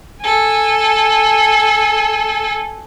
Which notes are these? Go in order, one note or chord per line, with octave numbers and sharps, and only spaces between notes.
A4 G#5